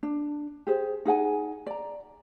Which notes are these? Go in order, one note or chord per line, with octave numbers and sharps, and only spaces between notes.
D4
G4 G#4 C5
D#4 G#4 F#5 G#5
D5 A#5